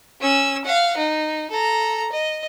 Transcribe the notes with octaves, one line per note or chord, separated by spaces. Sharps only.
C#4 E6
F5 F#5
D#4
A4 A#5
D#5